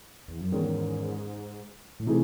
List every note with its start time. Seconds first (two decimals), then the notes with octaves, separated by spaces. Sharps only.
0.28 E2
0.41 F#2
0.52 E2 G#2 D#3 G#3 C#4
2.00 A2
2.06 C3 E3 A3 D#4 G#4